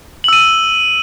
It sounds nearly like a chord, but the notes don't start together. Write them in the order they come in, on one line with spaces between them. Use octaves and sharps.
F#7 E6 D#7